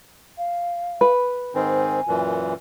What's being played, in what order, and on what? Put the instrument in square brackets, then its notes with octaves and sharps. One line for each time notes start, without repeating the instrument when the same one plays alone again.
[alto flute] F5
[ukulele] B4
[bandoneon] G#2 D#3 C4 [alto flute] G#5
[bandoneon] F#2 A#2 E3